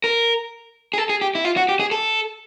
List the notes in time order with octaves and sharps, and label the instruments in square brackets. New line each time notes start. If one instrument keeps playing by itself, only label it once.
[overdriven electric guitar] A#4
G#4
A4
G#4
G4
E4
F4
F#4
G4
G#4
A4